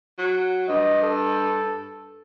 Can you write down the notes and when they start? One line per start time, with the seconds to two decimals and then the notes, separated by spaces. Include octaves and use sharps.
0.18 F#3
0.69 G2 D#5
1.03 A4